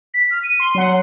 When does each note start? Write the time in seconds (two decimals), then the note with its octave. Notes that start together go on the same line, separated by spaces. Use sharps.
0.14 B6
0.31 F6
0.43 D#7
0.60 C6
0.75 F#3 F#5 C6